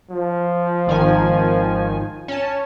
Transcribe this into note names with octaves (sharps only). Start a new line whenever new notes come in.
F3
G#1 D#3 G#5
C#4 A5